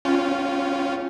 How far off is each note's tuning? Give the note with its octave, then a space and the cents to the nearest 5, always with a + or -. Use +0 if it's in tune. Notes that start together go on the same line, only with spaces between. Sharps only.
C#4 +0 F4 +0 G5 -30